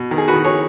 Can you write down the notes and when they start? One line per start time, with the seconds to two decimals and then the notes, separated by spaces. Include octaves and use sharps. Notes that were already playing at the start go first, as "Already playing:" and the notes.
Already playing: B2
0.11 D#3
0.18 G#4
0.28 F#4 B4
0.34 D#3
0.45 G#4 C#5